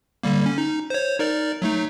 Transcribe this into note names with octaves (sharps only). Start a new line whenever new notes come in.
D3 G3 A#3
C#4
D#4
C5 C#5
D#4 A#4 D5
F#3 A3 D#4